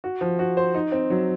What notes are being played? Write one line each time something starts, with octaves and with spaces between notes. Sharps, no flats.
F#4
F3
F#4
C5
D#4
C4
F#3